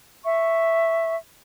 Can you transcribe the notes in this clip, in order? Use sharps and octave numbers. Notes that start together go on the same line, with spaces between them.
E5 C#6